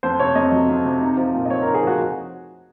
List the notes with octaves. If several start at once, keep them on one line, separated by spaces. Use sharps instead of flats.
F2 C5
C3 C#5
F2 D#5
F#3
F2
C3
D#4
F3
A#2
D#5
C4 C#5
D#4 A#4
G#4
F3 F#4